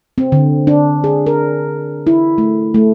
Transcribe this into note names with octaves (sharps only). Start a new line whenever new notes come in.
C4
D3
D4
G#4
A#4
E4
A3
A3